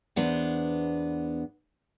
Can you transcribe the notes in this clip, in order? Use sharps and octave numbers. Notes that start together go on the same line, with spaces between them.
E2 B3 D4 C5